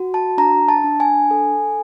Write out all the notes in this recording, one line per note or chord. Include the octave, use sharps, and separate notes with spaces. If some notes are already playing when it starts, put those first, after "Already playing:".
Already playing: F#4
A5
D4 A#5
A5
D4
G#5
A4